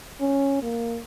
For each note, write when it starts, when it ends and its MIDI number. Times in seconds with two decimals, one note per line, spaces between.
0.21 0.62 61
0.63 0.98 58